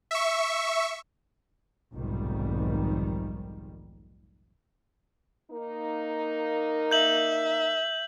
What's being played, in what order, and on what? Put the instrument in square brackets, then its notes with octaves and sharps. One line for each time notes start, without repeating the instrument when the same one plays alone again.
[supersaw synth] E5 C#6
[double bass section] F1 B1 G#2 D#3 G3
[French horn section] A#3 D#4 A#4
[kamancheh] E5 [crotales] G6 F#7